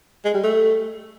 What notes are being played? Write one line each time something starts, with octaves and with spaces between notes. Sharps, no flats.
G#3
G3
A3